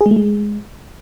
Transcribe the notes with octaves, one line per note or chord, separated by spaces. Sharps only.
G#4
G#3
A3
G#3